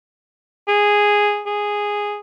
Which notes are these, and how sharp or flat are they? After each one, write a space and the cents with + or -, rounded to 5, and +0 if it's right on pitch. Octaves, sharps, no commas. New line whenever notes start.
G#4 -5
G#4 -5